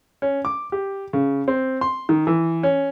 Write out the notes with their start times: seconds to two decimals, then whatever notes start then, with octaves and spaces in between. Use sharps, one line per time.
0.22 C#4
0.45 D6
0.72 G4
1.13 C#3
1.48 C4
1.81 C6
2.09 D#3
2.27 E3
2.63 C#4